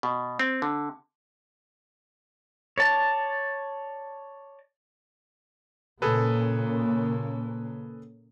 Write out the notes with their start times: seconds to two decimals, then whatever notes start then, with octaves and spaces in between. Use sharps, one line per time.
0.03 B2
0.39 C4
0.62 D3
2.78 C#5 D5 A5
6.02 A#2 C#3 A#3 G#4 A4 B4